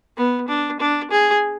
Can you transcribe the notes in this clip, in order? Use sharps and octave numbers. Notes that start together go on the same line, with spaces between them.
B3
D4
D4
G#4